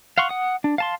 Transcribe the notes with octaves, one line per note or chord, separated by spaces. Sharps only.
F5 F#5 C6 C#6
F#5 D#6
D4
F5 A5 C6